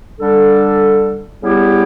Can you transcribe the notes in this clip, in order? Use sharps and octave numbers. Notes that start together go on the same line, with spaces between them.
D3 G3 D4 A4
C#3 G3 B3 E4 G4